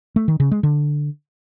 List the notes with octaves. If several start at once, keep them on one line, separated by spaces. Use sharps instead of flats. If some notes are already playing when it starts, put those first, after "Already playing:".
A3
D#3
C#3
G#3
D3